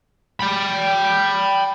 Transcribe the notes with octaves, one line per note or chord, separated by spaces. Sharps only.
G5 B5